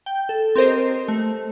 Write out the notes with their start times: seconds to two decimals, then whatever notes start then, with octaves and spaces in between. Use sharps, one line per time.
0.06 G5 G6
0.29 A4
0.56 C4 G4 A#4 C5 D#5
1.08 A3